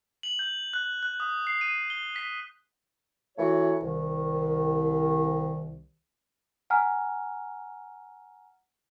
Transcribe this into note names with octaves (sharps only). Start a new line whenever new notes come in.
F#7
G6
F#6
F#6
D#6
C7
D#7
G7
B6
E3 A3 F#4 C#5
C2 D#3
F#5 G#5 A#5 F6